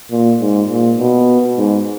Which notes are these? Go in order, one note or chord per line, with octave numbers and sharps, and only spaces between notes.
A#2
G#2
A#2
B2
G#2